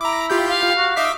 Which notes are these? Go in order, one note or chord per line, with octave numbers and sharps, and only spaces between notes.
E4 A#5 D6
F4 G4 G6
F5
F#4
D#4 E5 D6 B6